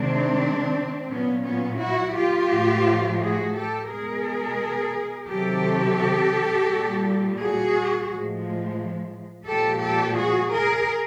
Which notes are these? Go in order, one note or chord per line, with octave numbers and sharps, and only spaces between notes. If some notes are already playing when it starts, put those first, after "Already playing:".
Already playing: C3 D#3 G#3 C4 D4
A#2 F#3 B3 C#4
B3 C#4
E4 F#4
F4 G4
A2 F3 G#3
F#4 G#4
G4 A4
B2 G#3 G#4 A#4
C3 D#3 F#3 G4 A4
A#2 G3
F#4 G#4
A2 F3 G#3
A#2 F3 G#3 G4 A4
G4 A4
F#4 G#4
G#4 A#4